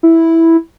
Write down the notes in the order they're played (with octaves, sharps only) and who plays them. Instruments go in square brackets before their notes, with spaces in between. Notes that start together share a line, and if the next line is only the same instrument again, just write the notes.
[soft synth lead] E4